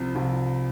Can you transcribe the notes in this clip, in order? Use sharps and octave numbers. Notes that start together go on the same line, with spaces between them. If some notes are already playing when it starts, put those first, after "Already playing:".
Already playing: C2 C3 F3
C2 C3 F3